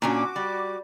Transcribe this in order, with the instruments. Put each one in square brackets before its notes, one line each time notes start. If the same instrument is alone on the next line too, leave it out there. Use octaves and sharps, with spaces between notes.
[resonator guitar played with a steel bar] A#2 C#4 D4 [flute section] F#4 D6
[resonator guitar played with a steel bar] G3